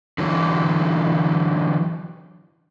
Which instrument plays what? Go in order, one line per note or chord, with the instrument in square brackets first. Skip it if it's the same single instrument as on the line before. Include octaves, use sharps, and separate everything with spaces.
[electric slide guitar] D3 E3 F#3